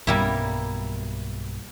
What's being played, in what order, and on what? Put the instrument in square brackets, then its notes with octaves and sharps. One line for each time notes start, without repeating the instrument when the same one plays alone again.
[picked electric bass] B1 G2 B2 [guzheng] G3 A#3 E4